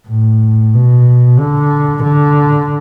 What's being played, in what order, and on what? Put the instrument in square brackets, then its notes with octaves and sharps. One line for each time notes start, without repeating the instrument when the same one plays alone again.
[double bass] A2
B2
D3
D3